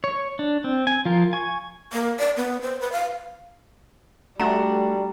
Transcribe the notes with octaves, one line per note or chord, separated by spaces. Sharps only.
C#5
D4
C4
G#5
F3 F4 A#4
G#5 C#6
A#3
D5
B3
C5
B4
F5
G3 A3 D4 F#4 A#5